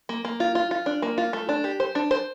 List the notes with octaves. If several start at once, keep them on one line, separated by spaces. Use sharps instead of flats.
A#3
A#3
F4
F4
F4
D4
A#3
F4
A3
D4
G4
C5
D4
C5